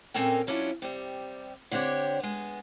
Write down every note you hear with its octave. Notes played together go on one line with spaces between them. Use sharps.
A#2 C4 C#4 A4 A#4 G5
F#3 C#4 D4 E4 F4
C3 G3
D3 C4 D4 G4 C#5
G#3 B3